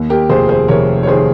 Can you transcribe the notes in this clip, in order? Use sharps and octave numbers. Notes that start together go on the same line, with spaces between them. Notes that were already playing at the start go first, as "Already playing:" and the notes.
Already playing: D#2
G4 A#4
F1 G#4 C5
G#4 C5
F1 A#4 C#5
C#5
D#3 G#4 C5